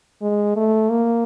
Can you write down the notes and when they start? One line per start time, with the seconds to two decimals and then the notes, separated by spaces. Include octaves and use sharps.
0.22 G#3
0.56 A3
0.90 A#3